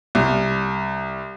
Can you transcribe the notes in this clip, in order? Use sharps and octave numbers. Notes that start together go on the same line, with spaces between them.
C2